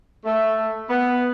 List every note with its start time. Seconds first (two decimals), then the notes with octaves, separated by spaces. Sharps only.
0.25 A3
0.90 B3